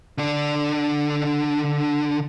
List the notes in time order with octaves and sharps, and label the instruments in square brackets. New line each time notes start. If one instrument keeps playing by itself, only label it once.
[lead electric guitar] D3 D4